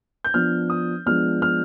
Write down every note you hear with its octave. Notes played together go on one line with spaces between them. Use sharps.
G6
F3 B3 D4 F6
D#6
F3 G#3 B3 D4 F6
F6